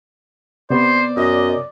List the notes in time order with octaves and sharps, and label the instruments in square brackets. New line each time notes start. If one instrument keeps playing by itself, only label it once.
[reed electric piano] C3 B3 [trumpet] C5 [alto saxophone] D5
[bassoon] F#2 [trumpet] D#5